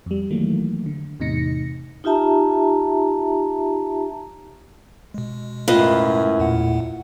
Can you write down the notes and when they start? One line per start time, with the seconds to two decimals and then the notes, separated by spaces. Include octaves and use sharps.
0.06 F2 G3
0.31 D#3 E3 F#3 A3 A#3
0.86 D3
1.20 E2 A2 C3 D#4 A#6 C#7
2.04 D#4 F4 G4 E5 A5 A#5
5.14 B2 G#3
5.68 F#2 A2 F4 B4 D#5
6.39 E2 A#2 F#5